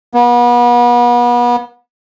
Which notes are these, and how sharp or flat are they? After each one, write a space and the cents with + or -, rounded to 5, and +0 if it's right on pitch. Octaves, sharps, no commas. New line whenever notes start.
B3 -35